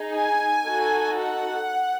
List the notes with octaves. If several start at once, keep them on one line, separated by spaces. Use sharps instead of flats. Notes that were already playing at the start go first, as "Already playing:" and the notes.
Already playing: D#4 G#4
G#5
D#4 F#4 A4
F#5